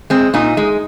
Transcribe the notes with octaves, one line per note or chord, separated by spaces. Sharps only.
G#3 C4
A#2 D#4
G#3